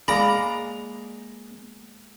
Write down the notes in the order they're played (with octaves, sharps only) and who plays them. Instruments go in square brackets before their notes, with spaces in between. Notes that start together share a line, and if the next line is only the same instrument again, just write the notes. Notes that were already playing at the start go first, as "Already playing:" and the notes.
[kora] G#3 A#3 D5 [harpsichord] A#5 [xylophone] B5